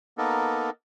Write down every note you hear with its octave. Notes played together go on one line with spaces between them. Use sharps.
A#3 B3 D#4 A4 A#4